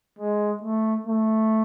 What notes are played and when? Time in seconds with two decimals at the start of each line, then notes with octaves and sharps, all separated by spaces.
0.19 G#3
0.63 A3
1.07 A3